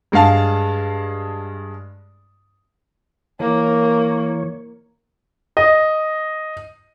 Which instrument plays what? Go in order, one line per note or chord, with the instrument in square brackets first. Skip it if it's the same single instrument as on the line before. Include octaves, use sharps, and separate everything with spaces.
[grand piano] G2 G#3 G#4 F5 A5
[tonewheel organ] E3 C#5 [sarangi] A#3
[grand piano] D#5